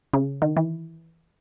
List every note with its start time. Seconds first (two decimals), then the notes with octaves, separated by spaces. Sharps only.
0.13 C#3
0.42 D#3
0.57 E3